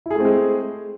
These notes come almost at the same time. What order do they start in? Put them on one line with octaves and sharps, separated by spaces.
E4 G#4 A3 C4 G#3